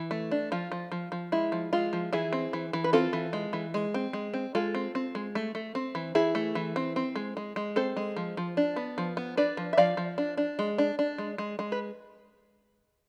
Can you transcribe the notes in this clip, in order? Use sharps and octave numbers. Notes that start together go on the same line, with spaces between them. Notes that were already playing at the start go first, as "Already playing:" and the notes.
Already playing: E3
A3
D4
F3 F4
F3
F3
F3
G#3 E4
F3
G#3 F4
F3
E3 E4 G#4
C4
E3
E3
B4
C4 F4 A4
E3
G#3
E3
G#3
C4
G#3
C4
G#3 F4 A4
C4
C4
G#3
A3
A3
C4
E3
E3 E4 G#4
A3
E3
C4
C4
G#3
G#3
G#3
C4 A4 C5
G#3
F3
F3
D4
B3
F3
B3
D4 B4 D5
F3
E5
F3 D5 F5
F3
D4
D4
G#3
D4
D4
G#3
G#3
G#3
B4